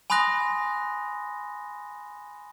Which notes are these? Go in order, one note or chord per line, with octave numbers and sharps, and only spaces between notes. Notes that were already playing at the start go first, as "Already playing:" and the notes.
G#5 B5 C6 D#6 F#6 A#6